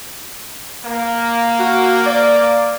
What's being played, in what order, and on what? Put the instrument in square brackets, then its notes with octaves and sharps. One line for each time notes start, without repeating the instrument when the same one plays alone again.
[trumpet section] A#3
[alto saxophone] F#4
D5